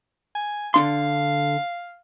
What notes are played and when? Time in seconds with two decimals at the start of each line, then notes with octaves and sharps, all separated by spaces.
0.35 G#5
0.74 D3 D4 F5 C6